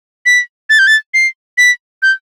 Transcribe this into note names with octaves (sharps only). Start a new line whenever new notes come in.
B6
A6
G6
A6
C7
B6
G6